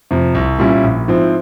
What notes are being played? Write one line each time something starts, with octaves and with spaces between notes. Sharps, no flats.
F2 C3
C2
A#2 G3 C#4 E4
A#1
G#2 F3 C4 E4